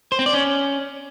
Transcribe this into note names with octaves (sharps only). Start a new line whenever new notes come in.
C5
C4
D5
C#4